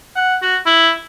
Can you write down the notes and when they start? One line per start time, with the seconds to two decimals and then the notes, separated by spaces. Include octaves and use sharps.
0.16 F#5
0.42 F#4
0.66 E4